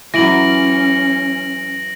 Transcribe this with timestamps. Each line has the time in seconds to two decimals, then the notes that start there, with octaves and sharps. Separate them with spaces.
0.14 E3 F#3 C#4 A#6 D7 F#7